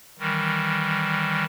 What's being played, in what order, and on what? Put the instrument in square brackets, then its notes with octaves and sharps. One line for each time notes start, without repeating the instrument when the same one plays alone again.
[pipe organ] D#3 E3 G3